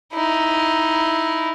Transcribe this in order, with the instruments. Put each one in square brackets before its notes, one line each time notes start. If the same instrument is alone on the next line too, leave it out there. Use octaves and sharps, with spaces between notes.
[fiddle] D#4 E4